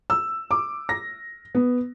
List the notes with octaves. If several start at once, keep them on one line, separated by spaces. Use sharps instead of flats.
E6
D6
A#6
B3